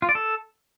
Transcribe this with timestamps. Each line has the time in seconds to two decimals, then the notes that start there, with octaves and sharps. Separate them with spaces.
0.02 F4
0.09 D5
0.15 A4